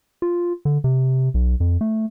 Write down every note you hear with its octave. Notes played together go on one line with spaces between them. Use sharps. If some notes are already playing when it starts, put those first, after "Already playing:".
F4
D3
C3
B1
F2
A3